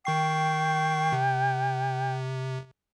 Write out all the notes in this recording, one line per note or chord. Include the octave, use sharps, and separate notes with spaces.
D#3 G5 C#6 C7
C3